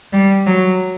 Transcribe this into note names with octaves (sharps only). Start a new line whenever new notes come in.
G3
F#3